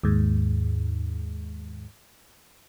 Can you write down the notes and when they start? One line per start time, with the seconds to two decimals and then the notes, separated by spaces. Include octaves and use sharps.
0.03 D#2 G#2